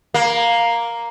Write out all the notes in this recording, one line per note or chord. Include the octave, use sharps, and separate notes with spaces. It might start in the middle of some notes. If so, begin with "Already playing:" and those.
A#3